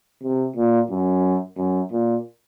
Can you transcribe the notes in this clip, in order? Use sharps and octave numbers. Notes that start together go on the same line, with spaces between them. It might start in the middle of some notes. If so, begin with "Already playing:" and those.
C3
A#2
F#2
F#2
A#2